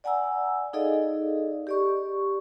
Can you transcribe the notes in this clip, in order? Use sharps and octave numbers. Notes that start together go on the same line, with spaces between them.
D5 F#5 G#5 A#5 E6
D#4 G#4 A4 D5 D#5 F5
G4 D5 C#6